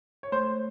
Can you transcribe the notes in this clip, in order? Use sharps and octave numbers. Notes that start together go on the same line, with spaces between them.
C#5
A3 C5